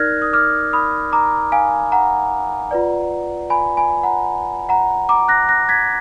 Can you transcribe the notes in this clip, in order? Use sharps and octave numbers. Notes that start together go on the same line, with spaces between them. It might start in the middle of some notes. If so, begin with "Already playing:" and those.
Already playing: D#4 A#4 D5 F6 F#6 G#6 A#6
D#6
D6 F6
B5 D#6
A#5 D6
F5 G#5
F#5 A#5
F4 B4 D5
G#5 B5
G#5 B5
F#5 A#5
F#5 A#5
A#5 D6
F#6 A#6
F#6 A#6
G#6 B6